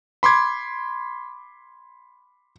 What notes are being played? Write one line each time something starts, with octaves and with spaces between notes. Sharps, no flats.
B5 C6 D6 G#6